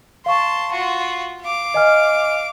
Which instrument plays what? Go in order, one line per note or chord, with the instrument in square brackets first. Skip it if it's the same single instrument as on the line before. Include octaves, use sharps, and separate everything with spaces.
[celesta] F5 C#6 [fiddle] A5 C6
[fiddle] F4 F#4
F5 D6
[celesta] D#5 G#5 F6